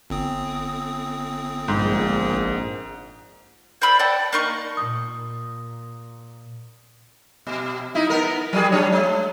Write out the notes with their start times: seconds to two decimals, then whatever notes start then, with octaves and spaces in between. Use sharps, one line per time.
0.10 G1 C4 D#6
1.68 A#1 G#2
3.82 C5 D5 B5 E6
3.99 D5 F#5 G5 A5
4.33 A#3 D#4 C#6
4.77 A#2 D#6
7.47 B2
7.95 D#4 E4
8.10 B3 A#4
8.53 F#3 G3 G#4
8.71 F#3 D4 C#5
8.92 G#3